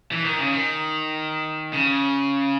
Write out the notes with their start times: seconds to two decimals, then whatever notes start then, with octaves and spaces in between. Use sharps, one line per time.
0.12 E3
0.25 D#3
0.39 C#3
0.53 D#3
1.73 C#3